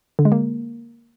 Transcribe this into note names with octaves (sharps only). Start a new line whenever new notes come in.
D3
G#3
A#3